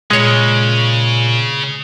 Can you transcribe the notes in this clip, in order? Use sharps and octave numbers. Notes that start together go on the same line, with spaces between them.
A#2 C#3 G#3 C#5